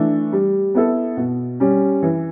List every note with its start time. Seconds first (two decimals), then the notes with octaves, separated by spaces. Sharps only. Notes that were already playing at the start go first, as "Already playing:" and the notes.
Already playing: E3 A3 D4
0.33 G3
0.75 B3 E4 A4
1.17 B2
1.60 G3 C#4
2.03 E3